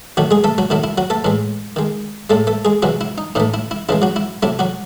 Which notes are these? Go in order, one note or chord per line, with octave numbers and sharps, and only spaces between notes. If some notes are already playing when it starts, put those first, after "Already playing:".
D#3 F#3 A3 F#4
G#3 G#4
A3 A4
F#3 F#4
D#3 F#3 A3 E4
E4
F#3 F#4
A3 A4
A2 E3 G#3
D#3 G#3
A2 G#3 A3 A4
A3 A4
G#3 G#4
C3 E3 F#3 G#3 F#4
E4
D#4
A2 E3 A3 D#4
E4
E4
C#3 E3 G#3 E4
F#3 F#4
E4
C3 F#3 A3 E4
F#3 F#4